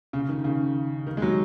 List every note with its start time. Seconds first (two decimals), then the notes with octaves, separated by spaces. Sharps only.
0.13 C#3
0.29 D#3
0.44 C#3
1.07 D#3
1.17 G#3
1.22 F#3